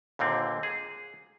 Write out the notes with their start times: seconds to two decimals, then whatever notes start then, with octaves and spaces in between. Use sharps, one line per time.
0.19 D#2 A#2 D3 C4
0.63 G#4